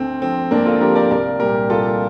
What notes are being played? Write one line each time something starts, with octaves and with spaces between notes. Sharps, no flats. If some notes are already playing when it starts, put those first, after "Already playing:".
Already playing: D2 C4
D3 F3 C4
D2 A#3 D4
F4 A4
D3 F3 G4 A#4
A#4 D5
C2 A#4 D5
A#2 G3 G4 A#4
C2 F4 A4